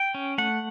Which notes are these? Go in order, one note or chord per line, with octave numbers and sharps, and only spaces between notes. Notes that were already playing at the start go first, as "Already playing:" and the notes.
Already playing: G5
C#4
A3 F#5